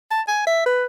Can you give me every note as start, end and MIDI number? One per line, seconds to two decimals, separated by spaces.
0.11 0.21 81
0.28 0.44 80
0.47 0.63 76
0.66 0.86 71